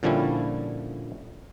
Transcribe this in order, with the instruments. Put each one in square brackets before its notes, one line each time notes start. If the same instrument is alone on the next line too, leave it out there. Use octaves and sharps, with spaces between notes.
[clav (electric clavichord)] A#2 D3 F3 G3 C#4 E4